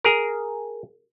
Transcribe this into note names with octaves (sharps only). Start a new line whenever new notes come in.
G#4 A#4